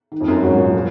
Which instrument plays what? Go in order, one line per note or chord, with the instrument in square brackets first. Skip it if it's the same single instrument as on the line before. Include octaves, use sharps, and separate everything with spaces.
[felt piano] D#3
[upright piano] F2
F#2
[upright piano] G#2 [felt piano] F#3 C#4 F#4
[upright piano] A#2
[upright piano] A#2 [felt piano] F3